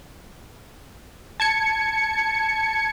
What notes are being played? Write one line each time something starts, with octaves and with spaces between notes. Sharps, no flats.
A5 G#6 C#7